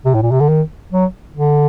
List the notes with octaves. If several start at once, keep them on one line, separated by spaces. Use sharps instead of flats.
C3
A2
A#2
C3
D3
D#3
F#3
D3